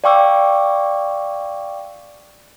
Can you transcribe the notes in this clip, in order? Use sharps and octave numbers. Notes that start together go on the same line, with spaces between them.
D5 F5 G5 C#6 D6 E6